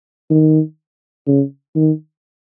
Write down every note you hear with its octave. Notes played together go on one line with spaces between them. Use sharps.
D#3
C#3
D#3